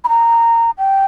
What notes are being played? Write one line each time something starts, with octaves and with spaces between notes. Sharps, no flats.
B5
A#5
G5